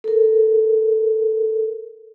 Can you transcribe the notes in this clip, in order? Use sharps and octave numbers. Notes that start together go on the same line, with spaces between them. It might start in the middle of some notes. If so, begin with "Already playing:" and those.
A4 A#4